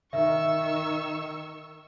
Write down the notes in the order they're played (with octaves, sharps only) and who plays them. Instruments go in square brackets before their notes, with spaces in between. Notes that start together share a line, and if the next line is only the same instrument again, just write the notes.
[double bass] D#3 [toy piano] E5 [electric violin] C#6 E6